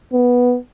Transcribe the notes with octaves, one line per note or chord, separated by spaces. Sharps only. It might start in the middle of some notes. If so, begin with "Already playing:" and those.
B3